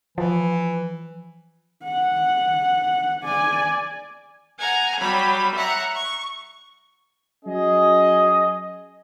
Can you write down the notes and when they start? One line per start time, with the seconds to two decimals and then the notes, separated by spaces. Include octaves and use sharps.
0.18 E3 F3
1.84 F#5
3.24 D5 G#5
4.58 F#5 G#5 A#5
4.99 F#3 G3 B5
5.54 E5 F#5 A#5
5.94 C#6
7.45 F#3 C#4 G#4 D#5